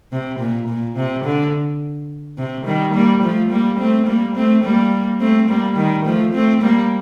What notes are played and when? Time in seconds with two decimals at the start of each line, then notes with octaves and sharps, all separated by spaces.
0.12 C3
0.39 A#2
0.68 A#2
0.96 C3
1.25 D3
2.38 C3
2.66 D#3 G3
2.93 G3 A#3
3.23 F3 A3
3.51 G3 A#3
3.79 A3 C4
4.07 G3 A#3
4.36 A3 C4
4.64 G3 A#3
5.20 A3 C4
5.49 G3 A#3
5.76 D#3 G3
6.05 F3 A3
6.33 A3 C4
6.62 G3 A#3